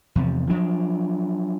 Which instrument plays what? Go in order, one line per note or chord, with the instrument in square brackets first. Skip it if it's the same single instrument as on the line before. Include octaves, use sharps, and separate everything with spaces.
[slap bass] E2 C3 F3
F3 F#3 D4